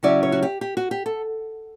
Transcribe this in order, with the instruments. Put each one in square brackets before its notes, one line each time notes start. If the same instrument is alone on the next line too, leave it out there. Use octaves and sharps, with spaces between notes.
[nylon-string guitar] C#3 F#3 C#4 E4 D5
C#5
F#4
G4
G4
F#4
G4
A4